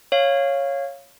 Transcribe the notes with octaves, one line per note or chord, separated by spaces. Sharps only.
C#5 F5